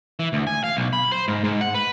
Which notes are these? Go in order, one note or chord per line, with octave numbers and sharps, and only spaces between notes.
E3
D2
G#5
F5
B1
B5
C5
G#2
G#2
F#5
B4